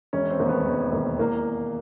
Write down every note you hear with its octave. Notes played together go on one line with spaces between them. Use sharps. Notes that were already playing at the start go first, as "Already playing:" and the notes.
E1 C#4
C4
D#2 D#3
B3
E1
D#2 D#3
E2 A#3